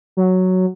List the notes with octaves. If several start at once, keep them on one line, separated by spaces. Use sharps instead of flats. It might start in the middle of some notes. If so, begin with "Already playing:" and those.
F#3